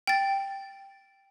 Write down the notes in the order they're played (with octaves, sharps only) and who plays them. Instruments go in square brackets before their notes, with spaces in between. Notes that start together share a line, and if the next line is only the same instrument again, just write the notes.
[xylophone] G5 A6